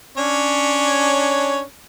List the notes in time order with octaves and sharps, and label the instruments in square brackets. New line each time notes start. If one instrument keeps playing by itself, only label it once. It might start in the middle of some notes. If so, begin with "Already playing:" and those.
[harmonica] C#4 D4 C#5